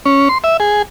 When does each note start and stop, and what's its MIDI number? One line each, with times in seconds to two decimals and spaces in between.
0.06 0.29 61
0.29 0.38 84
0.44 0.57 76
0.60 0.82 68